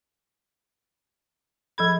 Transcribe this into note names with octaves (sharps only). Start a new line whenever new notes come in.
F3 A4 B5 G#6